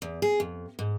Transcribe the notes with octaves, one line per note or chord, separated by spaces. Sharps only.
E2
G#4
F2
G#2